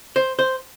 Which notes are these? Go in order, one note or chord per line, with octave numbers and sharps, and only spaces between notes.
C5
C5